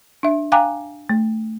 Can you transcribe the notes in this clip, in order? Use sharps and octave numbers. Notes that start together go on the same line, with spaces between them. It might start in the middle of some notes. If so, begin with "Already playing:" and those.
D4 E5
F5 G5 G#5 A#5 D6 F#6
A3